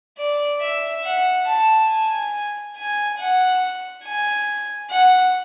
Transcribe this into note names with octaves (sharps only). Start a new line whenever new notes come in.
D5
E5
F#5
A5
G#5
G#5
F#5
G#5
F#5